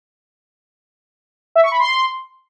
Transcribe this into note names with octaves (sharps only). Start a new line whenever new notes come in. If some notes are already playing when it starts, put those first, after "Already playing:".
E5
C#6
B5
C6